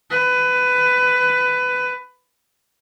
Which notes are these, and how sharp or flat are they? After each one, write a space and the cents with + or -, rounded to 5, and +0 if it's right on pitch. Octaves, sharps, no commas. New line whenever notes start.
B4 +20